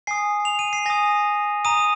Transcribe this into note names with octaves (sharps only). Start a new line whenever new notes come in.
G#5 D#6 C7
F7
D#7
C7
G#5 D#6 A#6
A#5 D#6 D#7